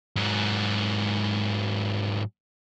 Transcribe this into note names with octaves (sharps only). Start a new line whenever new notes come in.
G#2 F#3